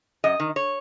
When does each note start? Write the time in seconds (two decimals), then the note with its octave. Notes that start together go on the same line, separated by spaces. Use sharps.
0.24 F#2 D#5
0.40 D#3
0.56 C#5